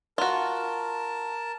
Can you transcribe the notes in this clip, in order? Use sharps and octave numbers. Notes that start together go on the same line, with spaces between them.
F4 F#4 A#4 A5